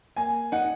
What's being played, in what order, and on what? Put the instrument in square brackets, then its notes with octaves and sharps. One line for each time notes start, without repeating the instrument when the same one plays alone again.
[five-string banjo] A#3 [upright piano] G#5
[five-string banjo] D#4 [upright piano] F#5